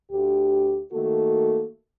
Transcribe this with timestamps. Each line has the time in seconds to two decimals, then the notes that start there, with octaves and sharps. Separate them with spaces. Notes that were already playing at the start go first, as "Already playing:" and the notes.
0.11 D2 G4
0.93 D#3 A3 A#3 F#4 A4